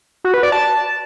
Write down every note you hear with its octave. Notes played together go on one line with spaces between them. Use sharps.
F#4
B4
D5
A5